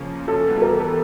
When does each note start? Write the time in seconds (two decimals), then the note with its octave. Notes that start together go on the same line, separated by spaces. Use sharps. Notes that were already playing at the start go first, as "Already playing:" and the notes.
Already playing: C#3 F3 A#3 C#4
0.28 A4
0.44 E3 G3 B3
0.57 A4
0.62 A#4
0.80 A4